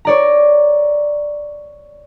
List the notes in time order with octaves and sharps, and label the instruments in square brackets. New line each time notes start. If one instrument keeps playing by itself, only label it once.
[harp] C#5 D5 A#5